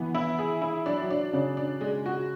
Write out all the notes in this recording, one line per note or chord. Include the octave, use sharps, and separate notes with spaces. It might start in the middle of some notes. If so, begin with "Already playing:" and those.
Already playing: E3 B3
E4
G#4
E4
F#3 D4
F#3
D4
C#3 D4
D4
G#3
F#4